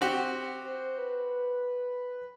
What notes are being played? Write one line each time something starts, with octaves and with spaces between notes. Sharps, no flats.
C4 F#4 G4
C5
B4